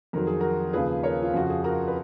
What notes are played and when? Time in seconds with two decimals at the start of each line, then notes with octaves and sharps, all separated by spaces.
0.13 F2 D#3 F#3 A#4
0.27 G#4
0.40 F#4 A#4
0.73 D#2 C#3 F3 G#4 B4
1.03 A#4 C#5
1.22 F4
1.34 F2 C#3 F3 F#4
1.50 G#4
1.64 F#4 A#4
1.88 B4